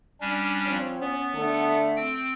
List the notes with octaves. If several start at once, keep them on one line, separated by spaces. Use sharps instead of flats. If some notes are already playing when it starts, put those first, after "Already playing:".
G3 C#4 D4
F3 C4 C#5
B3 C#4
D3 A3
C4 G5